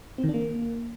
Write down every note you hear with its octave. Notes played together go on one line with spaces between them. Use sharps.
C4
D#3
D4
A#3